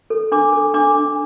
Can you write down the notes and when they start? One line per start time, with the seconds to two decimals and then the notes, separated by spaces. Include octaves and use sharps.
0.10 A4
0.32 D4 D6
0.53 A4
0.74 D4 D6
0.95 D4